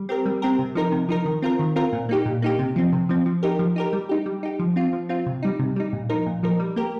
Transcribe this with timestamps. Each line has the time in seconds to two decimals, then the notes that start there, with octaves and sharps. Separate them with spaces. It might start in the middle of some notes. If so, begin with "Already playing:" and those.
Already playing: G3
0.09 C4 G4 A#4
0.26 G3
0.42 C4 G4 A#4
0.59 C3
0.75 F3 D#4 A#4
0.92 C3
1.09 F3 D#4 A#4
1.26 D#3
1.42 C4 F4 A#4
1.59 D#3
1.76 C4 F4 A#4
1.93 A#2
2.09 A#3 D#4 G4
2.26 A#2
2.42 A#3 D#4 G4
2.59 C3
2.76 F3 C4
2.93 C3
3.09 F3 C4
3.26 F3
3.43 D#4 G4 A#4
3.59 F3
3.76 D#4 G4 A#4
3.93 G3
4.09 D#4 G4
4.26 G3
4.43 D#4 G4
4.59 F3
4.76 C4 F4
4.93 F3
5.09 C4 F4
5.26 C3
5.43 G3 D#4
5.59 C3
5.76 G3 D#4
5.93 A#2
6.09 F3 D#4 A#4
6.26 A#2
6.43 F3 D#4 A#4
6.59 G3
6.76 A#3 G4 A#4